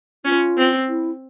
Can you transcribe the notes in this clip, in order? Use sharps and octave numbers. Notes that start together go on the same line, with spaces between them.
C#4 F4
C4
E4